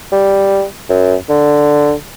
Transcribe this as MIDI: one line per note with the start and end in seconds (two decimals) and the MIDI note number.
0.12 0.63 55
0.89 1.14 42
1.30 1.92 50